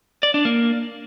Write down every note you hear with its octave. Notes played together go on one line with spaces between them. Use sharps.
D5
D4
A#3